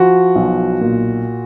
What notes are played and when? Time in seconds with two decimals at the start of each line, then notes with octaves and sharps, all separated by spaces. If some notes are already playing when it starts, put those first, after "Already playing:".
Already playing: F3 F#4
0.36 B1
0.81 A#2